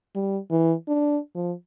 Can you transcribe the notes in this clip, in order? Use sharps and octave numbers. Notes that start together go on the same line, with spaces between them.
G3
E3
D4
F3